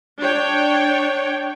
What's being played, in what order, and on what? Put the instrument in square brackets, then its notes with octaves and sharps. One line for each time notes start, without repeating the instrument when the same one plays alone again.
[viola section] D4 C#5 G5